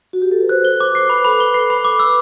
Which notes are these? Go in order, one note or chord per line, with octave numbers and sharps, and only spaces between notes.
F#4
G4
A4
B4
C5 F#6
G7
D6
C7
B4 B5
A4 B5
B4 G7
C7
B5
D6
E6
B4